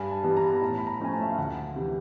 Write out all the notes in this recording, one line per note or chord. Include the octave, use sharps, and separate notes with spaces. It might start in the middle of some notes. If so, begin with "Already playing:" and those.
Already playing: G2 G#5
A5
E3 G3 B3
A#5
A2 A5
B5
A#5
F3 A3 C#4 G#5
A5
E5
F5
D2 F#5
C3 E3